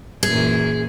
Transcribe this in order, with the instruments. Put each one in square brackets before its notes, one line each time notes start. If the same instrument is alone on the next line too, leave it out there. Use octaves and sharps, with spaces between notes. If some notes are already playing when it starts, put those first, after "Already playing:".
[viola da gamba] F#2 A#2 E3 [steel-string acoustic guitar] G#4